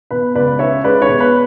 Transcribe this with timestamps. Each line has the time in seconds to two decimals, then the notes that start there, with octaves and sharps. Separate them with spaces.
0.11 B2 B4
0.35 C#2 B4 D5
0.59 C#4 C#5 E5
0.84 G#3 B4 D5
1.02 C#5
1.09 B2
1.20 B4